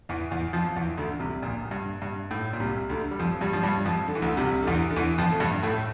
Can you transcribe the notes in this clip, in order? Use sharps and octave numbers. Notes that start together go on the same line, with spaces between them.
E2 E3
E2 E3
F2 F3
E2 E3
D2 D3
C2 C3
A#1 A#2
G2
G2
A2
A#2
C2 C3
D2 D3
G3
F2 F3
G2 G3
F3
G2 G3
F2 F3
D3
E3
D2 D3
C2 C3
D3
E2 E3
D3
E2 E3
F2 F3
A3
G2 G3
A2 A3